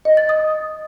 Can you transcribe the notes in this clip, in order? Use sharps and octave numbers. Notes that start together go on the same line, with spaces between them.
D#5
A6
D#6